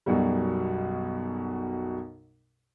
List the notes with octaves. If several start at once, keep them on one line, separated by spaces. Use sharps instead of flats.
B1 F#2 B2 G3